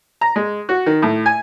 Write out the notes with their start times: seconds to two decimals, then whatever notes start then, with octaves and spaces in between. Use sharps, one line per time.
0.21 A#5
0.36 G#3
0.69 F#4
0.86 D#3
1.02 A2
1.26 G#5